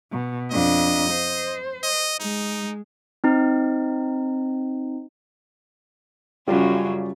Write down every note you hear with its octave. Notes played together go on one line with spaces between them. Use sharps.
B2
F2 D4 D#5
C5
D#5
G#3 D#4
C4 D#4
F#2 C#3 F#3 G3 F4 G4